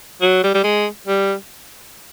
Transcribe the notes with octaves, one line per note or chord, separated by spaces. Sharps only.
F#3
G3
G3
G#3
G3